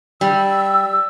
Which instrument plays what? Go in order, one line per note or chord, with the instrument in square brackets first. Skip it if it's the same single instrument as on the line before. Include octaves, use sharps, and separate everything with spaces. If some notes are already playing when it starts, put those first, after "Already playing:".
[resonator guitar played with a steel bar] G3 [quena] E6